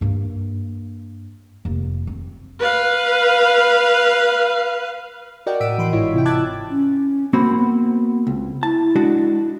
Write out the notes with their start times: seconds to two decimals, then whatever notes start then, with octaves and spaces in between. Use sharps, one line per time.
0.01 G2 A#3
1.65 F1 A#3
2.07 C4
2.59 B4 F5
5.46 F#4 A#4 D5 D#5 F#5 G5
5.60 A2 E6 B6 D7 D#7
5.78 E3 B5 C6 D7
5.93 G1 G#2 E4 F4 C#5 D#5
6.14 C3 E4 G5
6.25 A5 D6 E6 F#6 G#6 A6
6.71 C#4
7.33 A#3 C4 F#4 B5
7.57 B3
8.27 C#2
8.63 E4 A5
8.96 G#3 D4 F#4